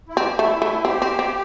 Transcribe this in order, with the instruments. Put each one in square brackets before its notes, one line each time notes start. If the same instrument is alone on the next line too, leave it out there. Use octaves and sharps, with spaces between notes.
[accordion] E4
[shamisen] C4 [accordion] G4
[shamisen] A3 [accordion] E4
[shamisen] A3 [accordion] E4
[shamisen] C4 [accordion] G4
[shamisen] C4
C4